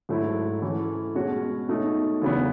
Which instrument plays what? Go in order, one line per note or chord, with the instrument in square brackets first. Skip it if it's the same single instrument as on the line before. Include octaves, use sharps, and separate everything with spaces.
[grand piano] G#2 F#3 A3 E4
E3 A3 C#4 F#4
B2 G#3 C#4 F#4
B2 A3 D#4
E2 C#3 F#3 B3